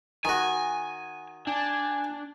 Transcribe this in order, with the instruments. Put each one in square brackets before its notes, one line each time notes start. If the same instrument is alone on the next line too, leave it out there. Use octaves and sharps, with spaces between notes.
[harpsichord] D#3 F#4 [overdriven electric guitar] G#5
[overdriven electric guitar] D4 [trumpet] G#5